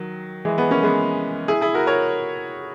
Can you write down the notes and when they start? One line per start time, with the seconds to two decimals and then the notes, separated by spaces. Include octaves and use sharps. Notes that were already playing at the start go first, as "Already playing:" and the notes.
Already playing: D#3 F#3
0.45 E3 G#3
0.58 G#3 B3
0.70 A#3 C#4
0.83 G#3 B3
1.48 E4 G#4
1.61 E4 G#4
1.74 F#4 A#4
1.87 A#4 C#5